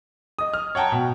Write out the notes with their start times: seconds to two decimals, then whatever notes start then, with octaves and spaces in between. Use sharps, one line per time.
0.39 D#5 D#6
0.54 F6
0.75 C#5 F#5 G5 A5 A#5
0.92 B2